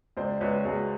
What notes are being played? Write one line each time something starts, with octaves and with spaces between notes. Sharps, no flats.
C#2 C5 D5
C#2 B4 C#5
C#2 F#4 G#4